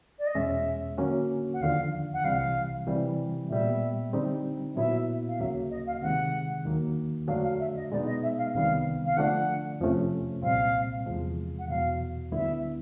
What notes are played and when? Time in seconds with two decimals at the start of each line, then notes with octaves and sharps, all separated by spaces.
0.19 D5
0.27 D#5
0.35 E2 B2 G#3 C#4 E5
0.98 D3 F#3 A#3 C#4 F#4
1.54 F#5
1.61 D#2 D3 F3 F5
2.13 F#5
2.24 C2 C3 E3 G3 F5
2.87 C3 E3 G3
3.50 A#2 G3 B3 E5
4.13 D3 G3 C4 D#4 G4
4.76 A#2 F#3 B3 E4 E5
5.28 F5
5.39 D2 C#3 F#3 A#3 E5
5.70 D#5
5.87 F5
6.02 C3 D#3 G#3 F#5
6.65 D#2 D#3 F#3 A#3
7.28 F2 D3 F#3 A3 D4 F5
7.43 F5
7.60 E5
7.75 D#5
7.91 B2 G#3 B3 D#4 D5
8.06 D#5
8.23 E5
8.38 F5
8.54 C2 C3 D#3 G3 B3 F5
9.05 F5
9.17 D3 F3 A3 D4 F#5
9.80 F2 C3 F3 A3 C#4
10.42 C2 A#2 G3 C4 F5
11.06 E2 C3 F3 G#3
11.59 F#5
11.69 E2 B2 F#3 F5
12.32 D2 D3 G3 B3 E4 E5